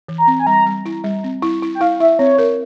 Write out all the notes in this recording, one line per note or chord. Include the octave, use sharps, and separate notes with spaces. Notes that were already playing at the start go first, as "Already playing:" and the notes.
E3
A#5
C4
G#5
G3 A#5
G3
E4
G3
C4
E4
E4
G5
E4 F5
E4 E5
C4 C#5
A#4